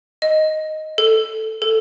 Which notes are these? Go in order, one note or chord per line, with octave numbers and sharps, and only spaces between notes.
D#5
A4
A4